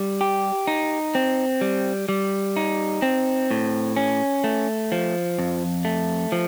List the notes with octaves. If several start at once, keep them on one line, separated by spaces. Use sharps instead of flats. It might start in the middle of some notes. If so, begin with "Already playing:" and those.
Already playing: G3
G4
D#4
C4
G3
G3
D#4
C4
A2
C#4
A3
F3
F2
A3
F3